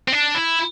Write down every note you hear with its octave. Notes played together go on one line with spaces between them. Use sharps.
C4
D4
E4